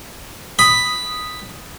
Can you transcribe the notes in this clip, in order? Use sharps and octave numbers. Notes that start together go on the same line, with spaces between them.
B5 D#6